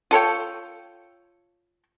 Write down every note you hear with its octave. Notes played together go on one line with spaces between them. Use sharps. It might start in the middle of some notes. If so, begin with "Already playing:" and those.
F4 A4 C#5 G5